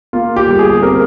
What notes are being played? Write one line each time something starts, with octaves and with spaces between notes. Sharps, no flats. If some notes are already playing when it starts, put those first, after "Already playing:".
A#3 F4
G4
G1
G#4
C4 A#4